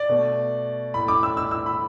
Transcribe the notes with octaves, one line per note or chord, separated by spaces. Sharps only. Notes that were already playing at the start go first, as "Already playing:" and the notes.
Already playing: D5
B2 A3
A2 A3 B5
D6
E6
E6
E6
B5